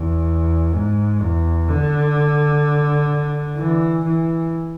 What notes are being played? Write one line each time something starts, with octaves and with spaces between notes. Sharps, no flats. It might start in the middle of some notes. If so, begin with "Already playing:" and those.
Already playing: E2
G#2
E2
D3
E3
E3